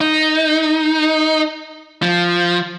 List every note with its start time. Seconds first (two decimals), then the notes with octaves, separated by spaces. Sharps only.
0.01 D#4
2.02 F3